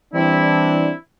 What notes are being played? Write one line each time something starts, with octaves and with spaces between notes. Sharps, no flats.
E3 G3 C4 D4 E4